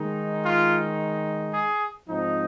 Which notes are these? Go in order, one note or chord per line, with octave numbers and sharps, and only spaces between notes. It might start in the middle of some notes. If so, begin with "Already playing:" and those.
Already playing: D#3 G#3 D#4
F4
G#4
G#2 F3 C4 D#4